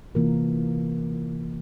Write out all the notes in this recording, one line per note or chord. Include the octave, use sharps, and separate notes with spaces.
C3 E3 A#3 F4 A#4